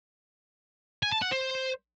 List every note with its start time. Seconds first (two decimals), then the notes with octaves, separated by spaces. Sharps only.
1.03 G#5
1.12 A5
1.22 F#5
1.31 C5